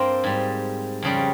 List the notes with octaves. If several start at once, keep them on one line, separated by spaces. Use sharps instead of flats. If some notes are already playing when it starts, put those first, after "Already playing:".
Already playing: G2 G3 A#3 C4
G#2 G3
F2 C#3 G3